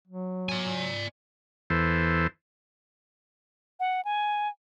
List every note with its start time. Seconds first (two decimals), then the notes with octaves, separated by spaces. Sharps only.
0.08 F#3
0.49 D5 G#5
1.70 E2 E3 A4 C5
3.80 F#5
4.05 G#5